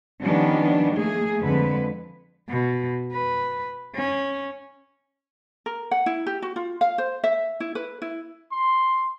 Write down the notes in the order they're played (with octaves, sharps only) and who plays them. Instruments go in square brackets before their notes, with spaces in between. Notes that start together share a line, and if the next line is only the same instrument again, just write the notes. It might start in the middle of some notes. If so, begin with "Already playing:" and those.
[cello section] D#3 F3 G3 B3 C#4 D4
A3 A#3 G#4
F2 D3 G#3 B4
[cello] B2
B4
C#4
[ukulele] A#4
F#5
E4
G4
F#4
F4
F5
C5
E5
E4
B4
E4
[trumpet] C6